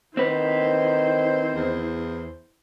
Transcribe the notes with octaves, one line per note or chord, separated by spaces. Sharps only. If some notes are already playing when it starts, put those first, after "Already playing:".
D#3 C4 E4 B4 C5
E2